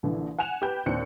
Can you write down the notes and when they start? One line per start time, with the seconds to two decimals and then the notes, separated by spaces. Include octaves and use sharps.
0.03 A#1 D3 E3
0.38 F#5 G#5 F#6 E7 F7
0.62 G4 B4 G5 G6
0.86 D#2 A#2 C4 D4 F#6 C#7